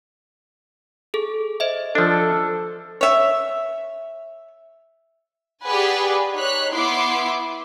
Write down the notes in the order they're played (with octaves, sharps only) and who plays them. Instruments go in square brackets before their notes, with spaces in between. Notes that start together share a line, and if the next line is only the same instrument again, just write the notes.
[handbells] G#4 A4
C5 D#5 E5
[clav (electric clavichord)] F3 D4 [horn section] A4
[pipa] C#5 E5
[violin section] G4 G#4 B4 D5 F#5 G#5
D#4 C#5 F#6 B6
B3 E4 B4 C6 D6 C7